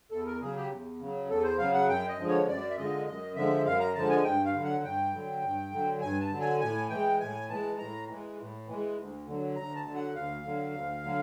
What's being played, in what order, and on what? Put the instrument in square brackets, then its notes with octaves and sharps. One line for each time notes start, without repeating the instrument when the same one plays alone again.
[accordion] E2 A4
A#4
C#3 F#3 G#4
G4
E2
C#3 F#3
E2 A4
C5
C#3 F#3 F5
F#5
F#2 G5
D#5
D3 F3 G#3
C#5
F#2 D5
E5
D3 F3 G#3 D#5
F#2 D#5
D3 F3 G#3 E5
F#2 F5
A#5
D3 F3 G#3 A5
G#5
G2 G5
F5
D3 F#3
F#5
G2 G5
D3 F#3
G2
D3 F#3
G2 G#5
A5
D3 F#3
G#5
A2 G#5
E3 G#3 G5
A2 G#5
E3 G#3 A5
A2 A#5
E3 G#3
A2
E3 G#3
D2
D3 F#3
D2 A#5
A5
D3 F#3
F#5
D2 F5
D3 F#3
D2
D3 F#3